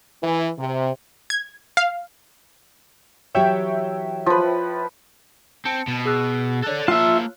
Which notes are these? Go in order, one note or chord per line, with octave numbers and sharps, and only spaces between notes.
E3
C3
G#6
F5
E3 F#3 G4 C#5 E5 G5
F3 B4
C4 A5 C#7
B2
G#4 E6 F#6
A4 C#5 D5 F#6
A#3 F4 E5 A5